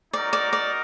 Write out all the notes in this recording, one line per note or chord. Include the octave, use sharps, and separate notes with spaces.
D#4 F#4 A#4 D5
D5
D5